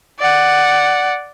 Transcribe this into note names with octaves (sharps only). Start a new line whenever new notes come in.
D5 F#5